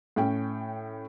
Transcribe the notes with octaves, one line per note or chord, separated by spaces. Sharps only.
A2 C#4 G5